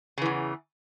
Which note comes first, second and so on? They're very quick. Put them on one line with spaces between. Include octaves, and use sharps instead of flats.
C#3 E3 E2